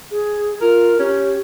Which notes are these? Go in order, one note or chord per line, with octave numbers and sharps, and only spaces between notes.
G#4
F4 A#4
C#4 G4